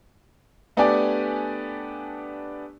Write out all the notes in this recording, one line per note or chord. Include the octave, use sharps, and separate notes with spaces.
A3 B3 D4 G4 D5 G#5